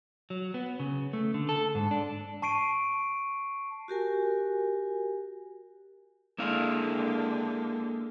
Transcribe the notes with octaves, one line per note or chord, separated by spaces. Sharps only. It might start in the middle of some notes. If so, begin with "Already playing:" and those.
F#3
B3
C#3
A3
D3
A4
G#2
D4
A5 C#6 C7 D7 D#7
F#4 G4 A#4 G#5
D3 G#3 A#3 E4 F5